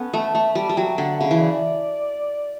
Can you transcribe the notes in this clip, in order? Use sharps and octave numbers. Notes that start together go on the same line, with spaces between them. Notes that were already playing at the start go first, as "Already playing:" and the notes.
Already playing: B3 C#4 A4
A3 A5
A3 A5
G3 A5
G3
F#3 G5
D3 F#5
C#3 E5
E3
D5